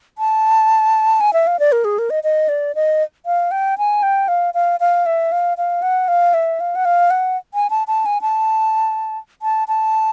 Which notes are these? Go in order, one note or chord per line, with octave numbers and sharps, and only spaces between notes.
A5
G#5
E5
F5
D5
A#4
G#4
A#4
D#5
D#5
D5
D#5
F5
G5
G#5
G5
F5
F5
F5
E5
F5
F5
F#5
F5
E5
F5
F#5
F5
F#5
G#5
A5
A5
G#5
A5
A5
A5